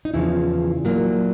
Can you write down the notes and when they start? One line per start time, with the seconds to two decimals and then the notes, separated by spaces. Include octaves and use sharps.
0.05 D#4
0.14 E2 C#3 F3 E4
0.85 A#2 F#3 A#3